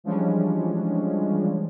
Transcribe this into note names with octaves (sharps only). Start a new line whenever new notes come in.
E3 F3 G3 G#3 C#4 D4